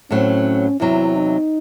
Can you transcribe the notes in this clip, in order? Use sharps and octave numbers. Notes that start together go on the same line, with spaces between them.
A2 F#3 C4 C#4
E2 C3 F#3 E4
D#4